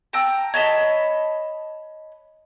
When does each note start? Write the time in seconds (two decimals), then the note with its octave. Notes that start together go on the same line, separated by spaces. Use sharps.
0.13 G5 A5 A#5 E6
0.54 C#5 D#5 A5 B5